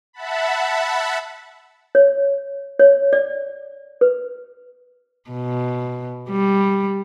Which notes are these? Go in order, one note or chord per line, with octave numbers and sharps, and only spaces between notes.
E5 F#5 A5 B5
C#5
C#5
D5
B4
B2
G3